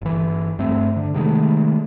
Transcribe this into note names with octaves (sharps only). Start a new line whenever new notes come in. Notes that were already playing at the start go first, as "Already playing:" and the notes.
G1 E3
G2 A3 C4
D3
C3 D#3 G#3 A3